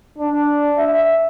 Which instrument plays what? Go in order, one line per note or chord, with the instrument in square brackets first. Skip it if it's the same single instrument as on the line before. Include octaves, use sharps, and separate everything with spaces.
[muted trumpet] D4
E5